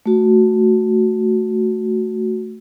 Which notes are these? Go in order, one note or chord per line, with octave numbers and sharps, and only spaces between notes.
A3 F#4